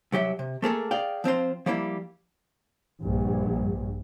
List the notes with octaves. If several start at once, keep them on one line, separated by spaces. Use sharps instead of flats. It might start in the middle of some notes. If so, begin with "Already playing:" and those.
C2 F#3 G4 E5
C3
A3 A#3 G#4 A4
G#4 D5 F5 G5
F3 C4 F4 C5
F3 G3 A#3 E4
A#1 G2